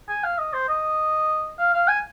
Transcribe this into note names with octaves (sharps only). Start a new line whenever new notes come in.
G#5
F5
D#5
C5
D#5
F5
F5
G#5